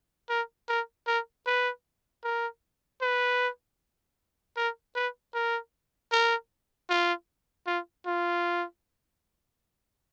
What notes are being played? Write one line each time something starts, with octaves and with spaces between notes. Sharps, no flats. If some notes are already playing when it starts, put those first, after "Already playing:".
A#4
A#4
A#4
B4
A#4
B4
A#4
B4
A#4
A#4
F4
F4
F4